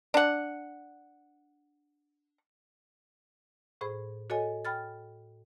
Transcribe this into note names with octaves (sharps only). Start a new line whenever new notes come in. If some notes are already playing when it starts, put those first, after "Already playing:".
D4 F#5
A2 G#4 C5 B5
F#4 A4 C#5 D#5 G#5
G5 B5 F6 A6